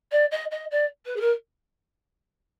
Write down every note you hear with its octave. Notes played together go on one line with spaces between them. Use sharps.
D5
D#5
D#5
D5
B4
G#4
A#4